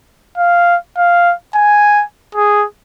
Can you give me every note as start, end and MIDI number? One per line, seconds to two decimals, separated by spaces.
0.38 0.76 77
0.97 1.34 77
1.55 2.04 80
2.35 2.65 68